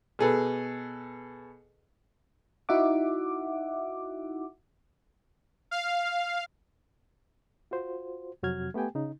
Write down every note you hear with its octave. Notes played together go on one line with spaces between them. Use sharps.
B2 G#4 A4 B4
D#4 E4 F#4 E5 F#5 D6
F5
F4 F#4 C5
F2 C3 F#3 F#4 F6 G#6
A3 B3 G4 G5 G#5
C#3 D#4